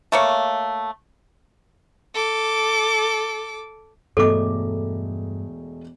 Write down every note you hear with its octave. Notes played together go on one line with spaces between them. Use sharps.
A3 A#3 C#5
A4 D6
E1 G2 A3 A4 D#5 D6